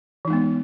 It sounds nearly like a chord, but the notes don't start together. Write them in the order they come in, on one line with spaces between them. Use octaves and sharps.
E3 D#4 G#3 B3